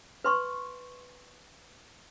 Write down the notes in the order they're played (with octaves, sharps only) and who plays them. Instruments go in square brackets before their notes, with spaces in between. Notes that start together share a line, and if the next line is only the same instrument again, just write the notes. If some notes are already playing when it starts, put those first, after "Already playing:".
[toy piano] B4 C6 C#6